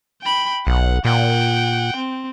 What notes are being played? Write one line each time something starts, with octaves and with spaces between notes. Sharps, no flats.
G5 B5
B1 F#5
A#2 F#5 G5
C4